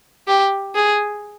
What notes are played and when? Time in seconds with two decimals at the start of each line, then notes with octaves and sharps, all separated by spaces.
0.28 G4
0.75 G#4